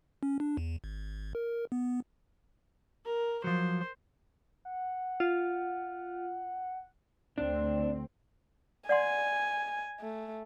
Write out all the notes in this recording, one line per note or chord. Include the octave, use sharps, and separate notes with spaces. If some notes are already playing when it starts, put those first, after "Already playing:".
C#4
D4
E2
G#1
A#4
B3
A#4
F3 F#3 C5
F#5
F4
D2 C4 D4
D5 F#5 G#5 C6
A3